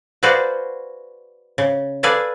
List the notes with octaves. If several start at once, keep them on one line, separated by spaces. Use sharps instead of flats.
F#4 G#4 B4 C5 D5 F5
C#3
G#4 A4 B4 D5 F5 G#5